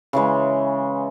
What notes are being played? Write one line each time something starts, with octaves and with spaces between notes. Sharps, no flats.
C#3 E3 G#3